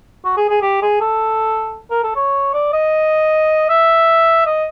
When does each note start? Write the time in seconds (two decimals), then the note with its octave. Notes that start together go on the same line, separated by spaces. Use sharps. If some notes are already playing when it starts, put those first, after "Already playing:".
0.25 F#4
0.37 G#4
0.50 G#4
0.62 G4
0.82 G#4
1.01 A4
1.90 A#4
2.04 A4
2.16 C#5
2.54 D5
2.73 D#5
3.69 E5
4.46 D#5